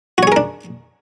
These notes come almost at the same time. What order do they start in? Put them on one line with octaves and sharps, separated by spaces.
F#4 C#5 G#4 A#4 D4